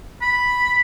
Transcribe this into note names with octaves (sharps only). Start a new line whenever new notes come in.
B5